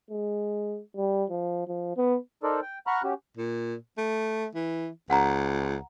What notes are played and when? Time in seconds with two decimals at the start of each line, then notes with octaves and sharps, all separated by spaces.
0.10 G#3
0.97 G3
1.30 F3
1.68 F3
1.97 B3
2.43 D#4 A4 A#4 C5 D5
2.62 G5
2.87 F#5 A#5 B5 C#6 F6 F#6
3.03 C#4 F#4 G4
3.37 A#2
3.98 A3
4.55 E3
5.10 C#2 F#5 A#5